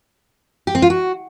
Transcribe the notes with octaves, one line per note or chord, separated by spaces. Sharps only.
G4
C4
F4
F#4